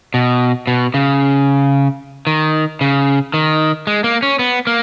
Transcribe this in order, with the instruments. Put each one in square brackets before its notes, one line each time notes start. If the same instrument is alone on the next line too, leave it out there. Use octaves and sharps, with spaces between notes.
[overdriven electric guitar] B2
B2
C#3
D#3
C#3
D#3
G#3
A#3
C#4
B3
A#3